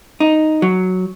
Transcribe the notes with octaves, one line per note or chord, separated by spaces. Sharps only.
D#4
F#3